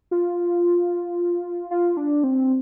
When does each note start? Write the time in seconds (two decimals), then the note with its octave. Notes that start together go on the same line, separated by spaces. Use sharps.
0.11 F4
1.71 F4
1.97 D4
2.24 C4